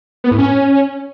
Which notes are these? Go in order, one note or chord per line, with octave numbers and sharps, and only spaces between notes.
B3
A2
C#4